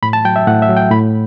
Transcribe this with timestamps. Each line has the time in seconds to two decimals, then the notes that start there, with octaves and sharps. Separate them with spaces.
0.03 A2 B5
0.13 A5
0.25 F#3 G5
0.36 E5
0.47 A2 F#5
0.62 E5
0.69 F#3
0.77 G5
0.91 A2 B5